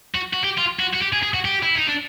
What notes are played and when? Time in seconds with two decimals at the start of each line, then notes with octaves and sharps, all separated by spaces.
0.15 F#4
0.34 F#4
0.44 G4
0.58 F4
0.80 F#4
0.94 F#4
1.02 G4
1.13 G#4
1.23 G#4
1.34 F#4
1.45 G4
1.63 E4
1.75 D#4
1.88 D4